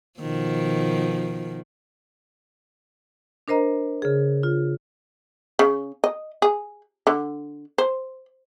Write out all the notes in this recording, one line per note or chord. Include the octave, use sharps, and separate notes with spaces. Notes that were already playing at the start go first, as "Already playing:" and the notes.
B2 D#3 F3
D4 A#4 C5 D#5 A#5
C#3 G#4
F4
C#3
D#5
G#4
D3
C5